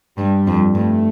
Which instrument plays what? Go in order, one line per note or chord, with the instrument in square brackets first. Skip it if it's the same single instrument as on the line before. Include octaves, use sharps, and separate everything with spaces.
[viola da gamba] G2 [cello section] G3
[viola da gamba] F2
[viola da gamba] G2 [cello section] A3